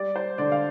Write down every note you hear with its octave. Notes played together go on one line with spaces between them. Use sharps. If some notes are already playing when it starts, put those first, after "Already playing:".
Already playing: G3 D5
C5
D3 D5
F5